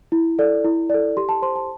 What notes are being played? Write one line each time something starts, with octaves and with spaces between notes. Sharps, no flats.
E4
A4 D5
E4
A4 D5
G4 C6
A5
C5 C6
A5